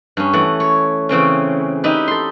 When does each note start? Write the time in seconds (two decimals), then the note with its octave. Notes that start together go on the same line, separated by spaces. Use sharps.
0.17 G2 C#4
0.33 E3 A3 F#5
0.60 C#5
1.09 C#3 E3 C4 C#4
1.84 D#4 E4 G4 B4
2.08 A4 C6